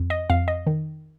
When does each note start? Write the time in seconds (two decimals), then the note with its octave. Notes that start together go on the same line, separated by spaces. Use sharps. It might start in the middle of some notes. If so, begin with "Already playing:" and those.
Already playing: F2
0.10 D#5
0.30 F2 F5
0.48 D#5
0.67 D#3